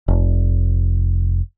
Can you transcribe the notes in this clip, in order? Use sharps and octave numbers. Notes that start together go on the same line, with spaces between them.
F1